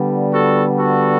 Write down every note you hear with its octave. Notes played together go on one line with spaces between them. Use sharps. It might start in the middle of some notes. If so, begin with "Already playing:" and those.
Already playing: D3 G3 B3
F#4 A4
F#4 A4